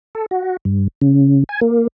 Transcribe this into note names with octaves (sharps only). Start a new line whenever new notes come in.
A4
F#4
G2
C#3
G#5
A#3